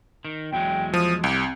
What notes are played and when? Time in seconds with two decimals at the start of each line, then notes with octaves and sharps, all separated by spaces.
0.25 D#3
0.53 E2 F#3 G#3 G5
0.94 F3 D#6
1.24 C2 C4 G4